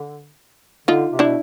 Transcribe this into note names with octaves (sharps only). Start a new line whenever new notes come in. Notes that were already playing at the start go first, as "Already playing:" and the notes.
Already playing: D3
D3 D#4 F4
C3
D4 E4
B2